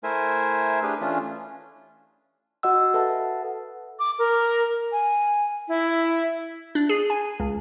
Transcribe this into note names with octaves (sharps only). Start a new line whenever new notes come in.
A3 E4 A#4 C5 E5 G#5
D4 G4 G#4 B4
E3 A3 C#4 D4 F4
F#4 D#5 F#5 E6
A4 B4 E5 F#5 A5
D6
A#4
G#5
E4
D4
G#4
G#5
C#2